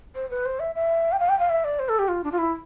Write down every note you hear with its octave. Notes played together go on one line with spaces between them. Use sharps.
C5
B4
C5
E5
E5
G5
F5
G5
F5
E5
D5
C5
A4
G4
F4
D4
F4
E4